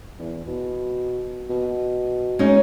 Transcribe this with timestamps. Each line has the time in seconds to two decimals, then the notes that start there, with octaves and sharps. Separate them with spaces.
0.19 E2
0.47 B2
1.50 B2
2.39 G#3 C#4 D#4